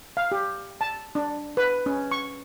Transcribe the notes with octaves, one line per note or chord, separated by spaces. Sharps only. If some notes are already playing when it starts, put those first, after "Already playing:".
F5
G4
A5
D4
B4
C#4
C#6